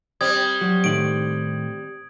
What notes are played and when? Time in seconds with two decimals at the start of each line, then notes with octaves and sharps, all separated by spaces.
0.21 G3 C4 D#6 G#6
0.61 F#3
0.84 A2 D#3 D7 F#7